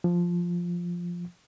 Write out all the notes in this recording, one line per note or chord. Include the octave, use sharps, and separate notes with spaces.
F3